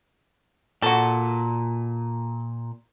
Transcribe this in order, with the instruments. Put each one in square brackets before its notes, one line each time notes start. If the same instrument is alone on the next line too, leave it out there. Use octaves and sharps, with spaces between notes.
[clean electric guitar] A#2 [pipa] F#4 A4